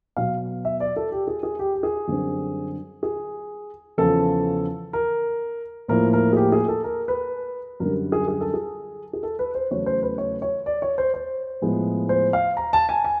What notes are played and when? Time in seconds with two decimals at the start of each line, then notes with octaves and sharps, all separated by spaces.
0.16 B2 F#3 B3 F5
0.65 E5
0.80 D5
0.96 A4
1.12 G4
1.27 G#4
1.43 G#4
1.59 G4
1.75 G4
1.83 G#4
2.07 F#2 D3 G3 C4
3.03 G#4
3.98 E2 C#3 F3 A4
4.93 A#4
5.88 A2 F3 A#3 A#4
6.13 A#4
6.33 G#4
6.37 G4
6.52 G#4
6.68 A4
6.84 A#4
7.08 B4
7.80 F#2 D3 G3 A#4
8.12 G#4
8.28 G#4
8.41 A4
8.54 G#4
9.13 G#4
9.23 A4
9.39 B4
9.55 C5
9.71 E2 C#3 F#3 A3 C#5
9.86 C5
10.03 B4
10.18 C#5
10.42 C#5
10.66 D5
10.82 C#5
10.98 C5
11.14 C5
11.62 A2 F3 G#3 B3
12.09 C5
12.33 F5
12.57 A#5
12.73 A5
12.89 G#5
13.04 G#5